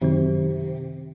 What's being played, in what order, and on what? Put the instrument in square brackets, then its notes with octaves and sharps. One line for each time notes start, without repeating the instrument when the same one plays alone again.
[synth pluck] F#2 D#3 F#3 C4 [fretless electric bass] C3